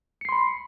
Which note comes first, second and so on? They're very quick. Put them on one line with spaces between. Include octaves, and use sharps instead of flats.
C#7 C7 C6 B5